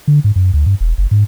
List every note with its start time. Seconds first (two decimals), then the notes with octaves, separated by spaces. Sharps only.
0.08 D3
0.24 G#2
0.36 F#2
0.54 D2
0.66 G2
0.80 E1
0.98 F#1
1.11 G#2